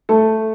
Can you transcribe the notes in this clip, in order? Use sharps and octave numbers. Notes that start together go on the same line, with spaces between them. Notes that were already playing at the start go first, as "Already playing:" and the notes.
A3 A4